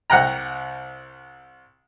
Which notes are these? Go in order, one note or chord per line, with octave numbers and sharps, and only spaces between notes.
C2 F#5 G5 A#5